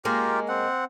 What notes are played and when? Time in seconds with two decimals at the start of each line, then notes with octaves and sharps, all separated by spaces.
0.05 G#3 A#3 C#4 F4 G4 A#4
0.48 C4 F#5